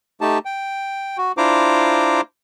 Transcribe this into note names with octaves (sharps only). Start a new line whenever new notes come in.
A3 D#4 G4 A5
G5
F#4
D4 E4 F4 C5 A#5 D6